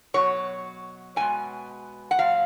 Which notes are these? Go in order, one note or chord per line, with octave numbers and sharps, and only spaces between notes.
B2 F#3 C#5
B2 G#3 G#5
F#5
A#2 F#3 F5